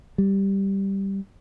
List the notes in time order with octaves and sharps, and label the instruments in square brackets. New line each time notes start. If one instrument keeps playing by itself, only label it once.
[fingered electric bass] G3